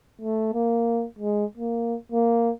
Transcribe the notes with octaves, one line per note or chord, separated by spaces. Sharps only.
A3
A#3
G#3
A#3
A#3